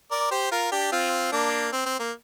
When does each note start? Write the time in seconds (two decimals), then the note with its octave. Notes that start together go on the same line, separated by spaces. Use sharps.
0.11 A#4 D5
0.31 G4 C5
0.51 F4 A#4
0.72 D4 G4
0.92 C4 F4
1.32 A#3 D4
1.72 C4
1.86 C4
1.99 A#3